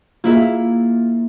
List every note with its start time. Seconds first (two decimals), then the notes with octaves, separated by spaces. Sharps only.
0.24 A#3 E4 F4 G#4 E5